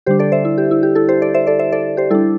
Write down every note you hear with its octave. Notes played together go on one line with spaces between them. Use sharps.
D3 G3 D4 G4 C5
A4 D5
C5 E5
E4
G4
E4
G4
E4 A4
G4 C5
A4 D5
C5 E5
A4 D5
C5 E5
A4 D5
G4 C5
G3 D4 E4 A4